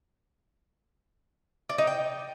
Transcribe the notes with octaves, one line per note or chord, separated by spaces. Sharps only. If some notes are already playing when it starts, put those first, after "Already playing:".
D5
D#4
G5